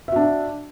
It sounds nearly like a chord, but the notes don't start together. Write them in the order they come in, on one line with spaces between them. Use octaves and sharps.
E5 F#4 D4